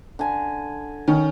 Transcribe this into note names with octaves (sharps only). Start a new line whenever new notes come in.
D3 G#5
D#3 C#4